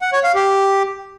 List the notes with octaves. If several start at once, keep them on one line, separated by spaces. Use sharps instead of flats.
F#5
C#5
F5
G4